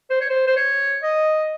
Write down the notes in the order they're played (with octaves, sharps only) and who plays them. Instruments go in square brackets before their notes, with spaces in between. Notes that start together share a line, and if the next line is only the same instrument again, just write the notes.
[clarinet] C5
C#5
C5
C5
C#5
D#5